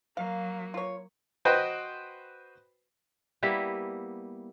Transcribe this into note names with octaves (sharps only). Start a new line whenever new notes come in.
F#3 A#3 F5
F4 C#5
F#4 B4 C5 D#5 G5
G3 A#3 B3 E4